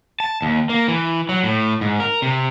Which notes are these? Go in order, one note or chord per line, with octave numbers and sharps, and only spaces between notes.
A5
D#2
A#3
E3
F#3
A2
G#2
A#4
C3